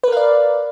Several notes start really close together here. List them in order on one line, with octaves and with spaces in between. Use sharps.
B4 A#4 F5 D5